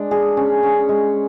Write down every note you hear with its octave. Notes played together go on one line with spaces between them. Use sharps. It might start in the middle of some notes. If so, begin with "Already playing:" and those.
Already playing: G#3 D4
G#4
C#4
C#4
G#3